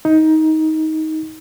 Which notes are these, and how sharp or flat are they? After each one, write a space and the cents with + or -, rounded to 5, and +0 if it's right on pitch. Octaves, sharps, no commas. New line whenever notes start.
D#4 +20